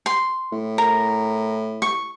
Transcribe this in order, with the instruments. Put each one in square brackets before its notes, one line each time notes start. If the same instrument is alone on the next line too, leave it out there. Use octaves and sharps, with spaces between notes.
[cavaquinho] C6
[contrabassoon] A2
[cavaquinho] A#4
C#6